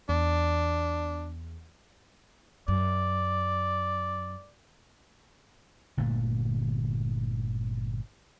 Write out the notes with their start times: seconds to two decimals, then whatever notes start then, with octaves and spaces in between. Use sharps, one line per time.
0.09 E2 D4
2.68 F#2 D5
5.97 G1 A#2 D3 A3